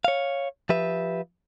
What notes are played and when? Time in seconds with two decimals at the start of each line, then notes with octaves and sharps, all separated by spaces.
0.05 C#5 F5
0.69 F3 G4 B4 E5